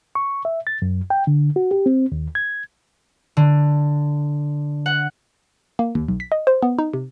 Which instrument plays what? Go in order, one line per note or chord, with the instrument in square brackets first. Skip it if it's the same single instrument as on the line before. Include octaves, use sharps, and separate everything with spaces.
[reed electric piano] C#6
E5
A6
F#2
G5
D3
F#4
G4
C4
D#2
G#6
[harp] D3
F#5
[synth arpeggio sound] A#3
D#2
B1
B6
D#5
C5
B3
D#4
C3